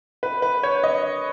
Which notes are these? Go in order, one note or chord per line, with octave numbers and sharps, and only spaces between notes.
B4
B4
C#5
D#5